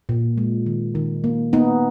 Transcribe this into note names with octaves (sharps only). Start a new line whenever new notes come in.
A#2
G#3
D#3
D#3
A#3
A#3 B3 D#4